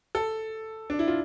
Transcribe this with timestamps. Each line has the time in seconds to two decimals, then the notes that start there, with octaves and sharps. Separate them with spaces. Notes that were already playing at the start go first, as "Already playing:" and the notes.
0.15 A4
0.90 D4
0.99 E4
1.08 F4